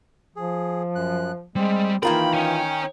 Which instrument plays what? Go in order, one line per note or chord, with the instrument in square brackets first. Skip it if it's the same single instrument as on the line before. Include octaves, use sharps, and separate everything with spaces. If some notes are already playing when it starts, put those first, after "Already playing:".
[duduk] F3 [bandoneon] G#4
[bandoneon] F#2 F#6
[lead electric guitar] G3 [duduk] G#3 [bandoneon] C4
[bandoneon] D#3 D#4 G5 [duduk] E3 [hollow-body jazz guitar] A#3 F4 A#4 [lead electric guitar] B5
[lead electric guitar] C#5 G#5